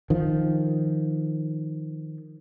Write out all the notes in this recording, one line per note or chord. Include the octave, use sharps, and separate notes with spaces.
D#3 F3